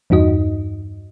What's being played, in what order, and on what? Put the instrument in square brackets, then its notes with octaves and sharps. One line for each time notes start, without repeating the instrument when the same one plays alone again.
[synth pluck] E2 G2 D#4 F#4 D#5